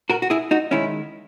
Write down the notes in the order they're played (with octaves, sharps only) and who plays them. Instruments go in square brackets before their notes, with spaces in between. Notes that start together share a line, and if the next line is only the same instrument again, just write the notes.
[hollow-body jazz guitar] F#4 A#4
F#4
E4 G#4
D#4 F#4
D#3 G#3 C#4 E4